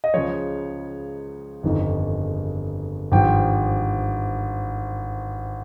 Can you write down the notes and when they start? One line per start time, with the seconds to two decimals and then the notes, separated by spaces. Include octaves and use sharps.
0.04 D#5
0.14 C#2 C#3 F3 C#5
1.63 G1 F2 D#3
3.12 G#1 G2 F3 G5